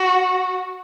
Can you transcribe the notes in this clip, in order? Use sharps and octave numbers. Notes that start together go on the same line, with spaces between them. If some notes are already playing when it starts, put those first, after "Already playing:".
Already playing: F#4